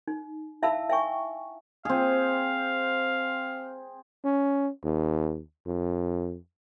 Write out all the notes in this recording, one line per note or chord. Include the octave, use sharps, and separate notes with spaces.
D#4
E4 E5 F5 A5 B5 E6
E5 G5 G#5 C#6
C4 G#4 F5
C#4
D#2
F2